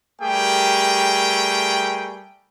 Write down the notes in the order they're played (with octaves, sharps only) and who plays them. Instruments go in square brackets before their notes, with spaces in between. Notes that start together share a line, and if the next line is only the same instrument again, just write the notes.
[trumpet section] G3 A3 G4 G#4 A#4 G5